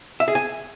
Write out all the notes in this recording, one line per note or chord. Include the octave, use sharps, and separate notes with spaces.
E5
G#4
G#5